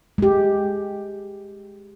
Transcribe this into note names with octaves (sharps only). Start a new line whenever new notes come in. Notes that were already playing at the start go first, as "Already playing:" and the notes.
G#3 G4